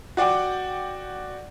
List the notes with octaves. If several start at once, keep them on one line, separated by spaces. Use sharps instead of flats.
F#4 D5 F#5 G5 D6